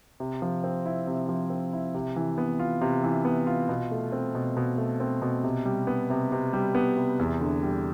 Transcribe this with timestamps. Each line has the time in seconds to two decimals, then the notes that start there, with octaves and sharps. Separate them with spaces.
0.20 C3
0.42 F3
0.64 C4
0.86 E4
1.07 C3
1.29 F3
1.50 C4
1.73 E4
1.94 C3
2.16 E3
2.38 B3
2.59 F4
2.81 C3
3.04 E3
3.25 B3
3.47 F4
3.69 B2
3.91 A3
4.12 C4
4.35 B2
4.57 B2
4.78 A3
5.00 C4
5.22 B2
5.43 C3
5.65 G3
5.87 B3
6.10 C3
6.32 C3
6.53 G3
6.75 B3
6.97 C3
7.19 E2
7.41 D3
7.63 G3